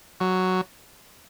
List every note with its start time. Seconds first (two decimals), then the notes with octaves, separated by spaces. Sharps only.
0.20 F#3